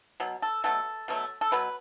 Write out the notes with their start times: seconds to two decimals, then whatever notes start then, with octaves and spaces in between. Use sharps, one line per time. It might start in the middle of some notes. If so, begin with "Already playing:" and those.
0.20 B2 F#3
0.42 A4
0.64 B2 F#3 A3 A4
1.08 B2 F#3 A3
1.41 A4
1.52 B2 F#3 B4